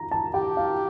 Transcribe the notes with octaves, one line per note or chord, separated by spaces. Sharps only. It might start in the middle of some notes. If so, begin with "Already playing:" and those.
Already playing: A#5
A5
G4 G5
F5